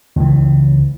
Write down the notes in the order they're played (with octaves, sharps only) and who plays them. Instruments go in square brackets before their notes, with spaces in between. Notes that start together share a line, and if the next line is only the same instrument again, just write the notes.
[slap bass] C#2 E3